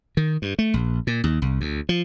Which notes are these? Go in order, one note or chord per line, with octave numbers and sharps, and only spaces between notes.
D#3
G2
A3
A#1
A#2
D#2
C2
D2
F3